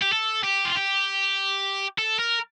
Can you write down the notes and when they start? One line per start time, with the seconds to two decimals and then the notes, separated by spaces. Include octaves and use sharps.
0.02 G4
0.13 A4
0.44 G4
0.65 F4
0.75 G4
1.98 A4
2.19 A#4